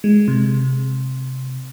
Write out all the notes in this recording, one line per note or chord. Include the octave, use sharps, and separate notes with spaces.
G#3
C3